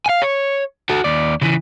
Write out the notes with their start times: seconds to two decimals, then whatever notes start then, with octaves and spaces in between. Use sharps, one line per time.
0.06 F5 G#5
0.22 C#5
0.89 F#4 A4
1.04 D#2 D5
1.41 C#3 E3